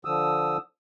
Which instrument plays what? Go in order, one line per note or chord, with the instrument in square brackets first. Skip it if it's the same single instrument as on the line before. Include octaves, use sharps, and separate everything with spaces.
[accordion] D3 F3 D#6 E6